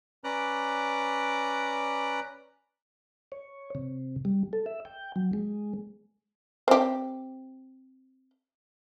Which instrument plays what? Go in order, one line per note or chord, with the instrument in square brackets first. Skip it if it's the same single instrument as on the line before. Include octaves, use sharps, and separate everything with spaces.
[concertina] C#4 B4 D5 A#5 D6 F#6
[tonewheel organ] C#5
C3
G3
A4
E5
G5
F#3
G#3
[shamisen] C4 G4